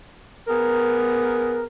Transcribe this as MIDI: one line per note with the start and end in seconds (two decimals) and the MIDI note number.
0.48 1.64 59
0.48 1.64 68
0.48 1.64 70